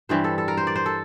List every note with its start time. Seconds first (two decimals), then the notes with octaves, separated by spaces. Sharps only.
0.09 G2 E3 G3 C5
0.24 A4
0.38 A4
0.48 A#4
0.57 C5
0.67 D5
0.76 C5
0.86 A4